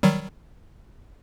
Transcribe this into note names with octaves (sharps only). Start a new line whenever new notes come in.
D#3 F#3 G3